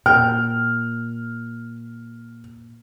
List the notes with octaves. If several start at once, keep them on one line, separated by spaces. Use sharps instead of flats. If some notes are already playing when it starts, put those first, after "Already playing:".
A#2 G5 F6